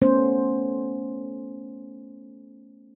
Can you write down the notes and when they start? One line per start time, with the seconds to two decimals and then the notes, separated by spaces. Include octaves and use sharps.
0.02 A3 B3 C#4 C5